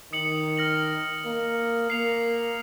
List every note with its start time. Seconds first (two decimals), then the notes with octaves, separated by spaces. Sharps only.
0.13 D#3 D#6 C#7 F#7
0.57 F6 A#6 F#7
1.26 A#3
1.90 A#3 C7 F7